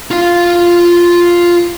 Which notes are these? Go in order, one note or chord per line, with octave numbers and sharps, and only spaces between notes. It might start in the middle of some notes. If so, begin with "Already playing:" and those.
F4 F5